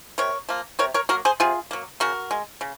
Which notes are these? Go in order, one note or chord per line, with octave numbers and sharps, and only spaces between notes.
C3 A#4 C#5
F3 A#3
C3 A#4 C#5
A#4 C#5
F#3 A#3 F#4 A#4
G#4 C5
C3 F4 G#4
F#3 A#3
C#3 F#4 A#4
G#3
C#3